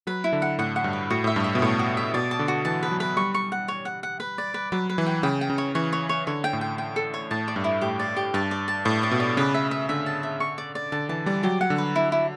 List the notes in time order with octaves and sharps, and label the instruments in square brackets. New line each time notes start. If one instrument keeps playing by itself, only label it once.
[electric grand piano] F#3 [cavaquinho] B4
[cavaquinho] E4
[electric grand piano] D3
[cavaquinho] F#5
[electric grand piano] A2 [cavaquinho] F#5
[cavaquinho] F#5
[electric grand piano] G2
[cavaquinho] B4
[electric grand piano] A2 [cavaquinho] F#4
[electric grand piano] A2 [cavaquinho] E5
[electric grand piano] G2
[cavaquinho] E5
[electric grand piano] B2
[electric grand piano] A2 [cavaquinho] C#5
[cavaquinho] F#4
E5
[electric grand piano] B2 [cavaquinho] D5
[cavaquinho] A5
[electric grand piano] D3
[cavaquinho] F#4
[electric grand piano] E3 [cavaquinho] A5
[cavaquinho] B4
[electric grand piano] F#3
[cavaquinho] B4
[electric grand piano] G3 [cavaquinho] C#6
[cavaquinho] C#6
F#5
C#5
F#5
F#5
B4
D5
B4
[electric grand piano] F#3 [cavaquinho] B4
[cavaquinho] B4
[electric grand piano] E3
[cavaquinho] G5
[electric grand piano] C#3 [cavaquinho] G5
[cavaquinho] G5
[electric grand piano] C#3
[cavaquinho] C#5
[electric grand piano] E3 [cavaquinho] C#5
[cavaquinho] C#5
C#5
[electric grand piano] D3 [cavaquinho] C#5
[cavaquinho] G5
[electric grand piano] A2
[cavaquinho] G5
G5
A4
C#5
[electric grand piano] A2 [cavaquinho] A5
[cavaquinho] D5
[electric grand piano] G2
[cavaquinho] E4
[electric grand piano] A2 [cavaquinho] G4
[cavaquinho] D5
G4
[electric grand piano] G2 [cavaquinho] A5
[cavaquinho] D5
A5
[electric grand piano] A2 [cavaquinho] D5
[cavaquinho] D5
[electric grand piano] B2
[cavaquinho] D5
[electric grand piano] C#3 [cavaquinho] B4
[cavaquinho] E5
E5
[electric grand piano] D3 [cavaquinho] E5
[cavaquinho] A5
E5
C#6
D5
D5
[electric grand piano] D3 [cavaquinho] A5
[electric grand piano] E3 [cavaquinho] A5
[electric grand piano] G3 [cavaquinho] D5
[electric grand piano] F#3 [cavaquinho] G4
[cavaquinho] F#5
[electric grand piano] D3
[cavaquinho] B4
E4
E4